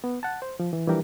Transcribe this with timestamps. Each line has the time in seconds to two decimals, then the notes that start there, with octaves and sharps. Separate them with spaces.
0.04 B3
0.23 F#5 A5
0.42 C5
0.60 F3
0.73 E3
0.88 E3 F3 G3 D4 G4 A#4